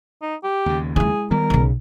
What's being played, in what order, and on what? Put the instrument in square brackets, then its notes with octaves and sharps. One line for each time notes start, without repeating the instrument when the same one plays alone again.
[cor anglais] D#4
G4
[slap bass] D#2 C#3
[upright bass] G#3 E4 [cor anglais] G#4
[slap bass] D#3 G3 B3 [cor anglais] A#4
[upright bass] B1 C#3